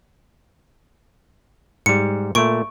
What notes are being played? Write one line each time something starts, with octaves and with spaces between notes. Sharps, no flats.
G#2 G3 C#7
A#2 A3 C#6 D7